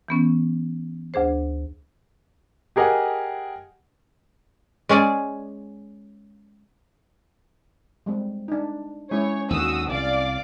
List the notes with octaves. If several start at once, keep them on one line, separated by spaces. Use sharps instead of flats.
E3 B3 C#4
D2 D4 G#4 C5
G4 G#4 A#4 D#5 F#5
G#3 C#4 G#4 D5
G3 G#3 C4
D4 D#4
G#3 C#4 E4 C#5 C#6
D#2 D3 F#4 D#6 E6
C2 D5 F5 D6